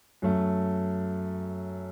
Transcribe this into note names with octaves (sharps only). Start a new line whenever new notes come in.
F#2 F#3 A3